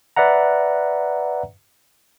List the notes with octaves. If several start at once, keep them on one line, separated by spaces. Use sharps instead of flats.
B4 D5 E5 F#5 A#5